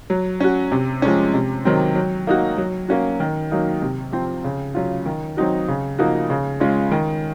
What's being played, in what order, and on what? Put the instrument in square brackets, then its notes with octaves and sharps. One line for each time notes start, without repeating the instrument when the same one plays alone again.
[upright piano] F#3
C#4 F#4
C3
F3 G#3 C#4
C3
D#3 F#3 C4
F#3
A#3 D#4 F#4
F#3
A#3 C#4 F#4
D#3
F#3 A#3 D#4
C3
F3 C4
C#3
F#3 C#4 F4
D#3
F#3 C4 D#4 F#4
C#3
F3 A#3 D#4 F#4
C#3
G#3 C#4 F4
D#3